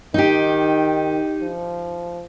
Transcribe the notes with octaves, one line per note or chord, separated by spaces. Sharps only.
D#3 D#4 G4
F3